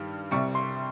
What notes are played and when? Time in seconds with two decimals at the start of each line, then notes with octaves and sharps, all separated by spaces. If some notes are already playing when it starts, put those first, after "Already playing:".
Already playing: G2 D#3 G3
0.31 C2 C3 G3 C#6
0.55 C6